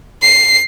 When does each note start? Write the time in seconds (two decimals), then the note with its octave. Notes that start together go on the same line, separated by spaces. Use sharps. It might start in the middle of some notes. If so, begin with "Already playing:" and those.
0.23 C7